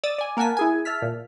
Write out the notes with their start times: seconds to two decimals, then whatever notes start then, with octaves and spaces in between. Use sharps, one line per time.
0.04 D5 D#6 E6 A6
0.18 D5 G#5
0.37 A#3 A#4 F#5 G#5 A5 B6
0.57 E4 G#4 G#5
0.85 E5 A5 F6 B6
1.02 A#2